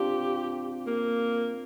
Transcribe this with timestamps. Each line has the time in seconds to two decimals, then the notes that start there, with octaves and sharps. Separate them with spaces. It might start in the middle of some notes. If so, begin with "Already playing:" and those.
Already playing: C4 D4 F4 G4
0.87 A#3